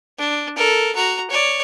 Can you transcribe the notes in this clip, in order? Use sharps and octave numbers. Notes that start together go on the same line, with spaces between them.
D4
A4 A#4
F#4 A#5
C#5 D5